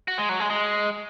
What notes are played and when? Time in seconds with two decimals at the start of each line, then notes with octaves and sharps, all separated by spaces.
0.08 F#4
0.18 G#3
0.29 F#3
0.40 G#3
0.50 G#3